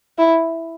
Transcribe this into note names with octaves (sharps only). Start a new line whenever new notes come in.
E4